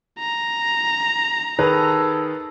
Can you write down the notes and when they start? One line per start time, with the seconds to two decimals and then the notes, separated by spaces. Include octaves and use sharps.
0.19 A#5
1.59 D#3 G#4 A4 B4